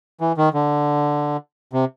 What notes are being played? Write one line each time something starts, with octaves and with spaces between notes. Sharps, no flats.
E3
D#3
D3
C3